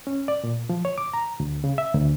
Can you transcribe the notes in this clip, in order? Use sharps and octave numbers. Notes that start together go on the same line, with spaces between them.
C#4
D5
A#2
F3
C#5
D6
A#5
D2
C#3
E5
D2